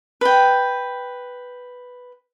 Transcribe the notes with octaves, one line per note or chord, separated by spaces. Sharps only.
B4 G5